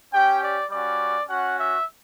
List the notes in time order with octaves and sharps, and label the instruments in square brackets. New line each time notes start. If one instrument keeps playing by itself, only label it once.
[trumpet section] C#4 G4 G5
D5
G3 C#4 F#4 D5
C#4 F#4 F#5
E5